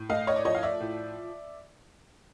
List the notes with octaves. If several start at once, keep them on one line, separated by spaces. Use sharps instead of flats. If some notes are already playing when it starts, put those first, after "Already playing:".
Already playing: A2
A3 D#5 F5
C#5 D#5
D5
F3 C#5 D#5
F5
D5 E5
A2